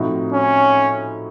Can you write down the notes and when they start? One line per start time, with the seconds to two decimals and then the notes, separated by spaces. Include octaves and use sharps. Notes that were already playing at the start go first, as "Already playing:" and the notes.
Already playing: A2 F3 C4 D#4 F#4
0.32 C#4